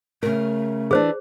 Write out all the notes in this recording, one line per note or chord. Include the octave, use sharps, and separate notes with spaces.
C#3 A3 A#4
E3 D4 G#4 C5